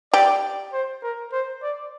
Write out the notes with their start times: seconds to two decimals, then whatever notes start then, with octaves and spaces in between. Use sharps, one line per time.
0.13 G4 D5
0.73 C5
1.02 A#4
1.32 C5
1.63 D5